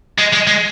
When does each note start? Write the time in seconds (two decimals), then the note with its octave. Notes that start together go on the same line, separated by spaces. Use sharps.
0.18 G#3
0.33 G#3
0.47 G#3